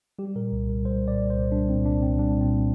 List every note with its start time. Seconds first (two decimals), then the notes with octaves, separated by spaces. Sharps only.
0.19 G3 G4
0.36 A#2 A#4
0.52 C2
0.69 C2 A#4
0.85 G3 C5
1.03 A#2 D5
1.19 C2
1.30 C5
1.35 C2
1.52 G3 D4
1.69 A#2 C4
1.85 C2 D4
2.02 C2 C4
2.19 G3 D4
2.36 A#2 C4